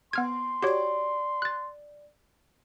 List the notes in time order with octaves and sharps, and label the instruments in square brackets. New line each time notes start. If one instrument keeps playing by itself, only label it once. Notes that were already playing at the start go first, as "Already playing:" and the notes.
[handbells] B3 F6 G#6 [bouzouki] C4 [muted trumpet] C6
[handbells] F#4 G4 C#5 [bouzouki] D5 G5
[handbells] F#6 A6